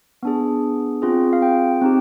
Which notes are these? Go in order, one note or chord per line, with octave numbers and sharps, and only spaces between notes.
B3 D4 G#4
C4 F4 G#4
F5
G5
C4 D#4 G4